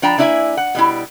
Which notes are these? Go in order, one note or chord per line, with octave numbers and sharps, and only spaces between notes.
F3 D4 D5 G5 A5 A#5
A#3 D4 E4 D5 E5 G#5
F#5
B2 G3 E4